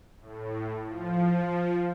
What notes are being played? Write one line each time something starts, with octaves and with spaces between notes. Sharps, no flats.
A2
F3